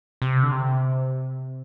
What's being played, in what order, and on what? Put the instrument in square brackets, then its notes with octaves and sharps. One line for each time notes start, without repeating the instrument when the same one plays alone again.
[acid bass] C3
D3
C3